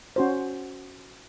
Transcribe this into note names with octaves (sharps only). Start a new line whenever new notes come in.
C#4 F#4 C5